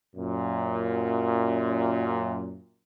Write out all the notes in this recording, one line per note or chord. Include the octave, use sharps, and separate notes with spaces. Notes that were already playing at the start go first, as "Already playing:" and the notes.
F#2 A#2